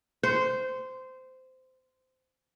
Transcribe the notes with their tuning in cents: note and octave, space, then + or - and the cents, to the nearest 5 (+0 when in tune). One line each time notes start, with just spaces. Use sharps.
C5 -15